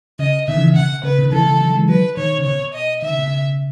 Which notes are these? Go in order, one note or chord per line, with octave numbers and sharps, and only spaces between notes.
C#3 D#5
B2 D#3 E5
C#3 E3
C#3 F#5
C#3 B4
B2 D#3
C#3 E3 A4
C#3 E3
D#3 F#3
E3 G#3
D#3 F#3 B4
B2 D#3 C#5
C#3
B2 C#5
B2
D#5
D#3 E5
C#3
B2
C#3